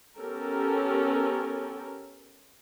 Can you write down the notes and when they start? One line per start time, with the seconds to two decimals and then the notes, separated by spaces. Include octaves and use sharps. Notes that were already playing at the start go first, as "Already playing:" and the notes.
0.18 B3 C#4 G4 A4 A#4